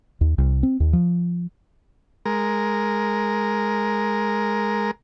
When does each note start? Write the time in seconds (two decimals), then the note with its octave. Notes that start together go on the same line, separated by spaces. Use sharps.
0.21 D#2
0.38 C2
0.63 C4
0.80 D#2
0.93 F3
2.26 G#3 A#4